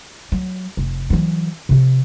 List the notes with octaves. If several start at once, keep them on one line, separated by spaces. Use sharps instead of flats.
F#3
F1
E3 F#3
C3 F3